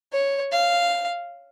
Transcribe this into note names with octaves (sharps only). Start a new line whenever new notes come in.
C#5
F5